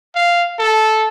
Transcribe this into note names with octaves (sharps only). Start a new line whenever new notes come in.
F5
A4